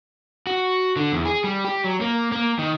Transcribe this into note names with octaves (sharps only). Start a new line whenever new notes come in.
F#4
D3
E2
G#4
G3
G4
F#3
A#3
A#3
D#3